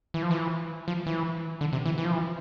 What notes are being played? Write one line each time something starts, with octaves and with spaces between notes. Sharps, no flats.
E3
F3
E3
F3
E3
D3
C3
E3
E3
F3
E3